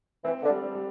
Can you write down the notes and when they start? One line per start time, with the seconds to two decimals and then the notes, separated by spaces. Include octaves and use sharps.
0.25 E3 C4
0.43 D3
0.50 G3
0.75 G3